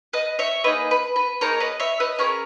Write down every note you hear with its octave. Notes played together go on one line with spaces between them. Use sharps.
B4 D#5
C#5 E5
A#3 D#4 G#4 B4 D#5
B4
B4
A#3 D#4 G#4 A#4 C#5
B4 D#5
C#5 E5
B4 D#5
C#4 G#4 A#4 C#5